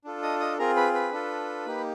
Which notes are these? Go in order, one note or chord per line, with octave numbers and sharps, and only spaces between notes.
D4 F4 A4
D#5 D#6
D#5 D#6
C4 F4 G#4 A#4 A#5
B4 B5
B4 B5
D4 F4 A4
A#3 D#4 G4